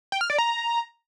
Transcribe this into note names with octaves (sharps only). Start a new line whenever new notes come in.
G5
F6
D5
A#5